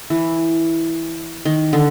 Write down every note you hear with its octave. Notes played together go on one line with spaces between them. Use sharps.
E3
D#3
D3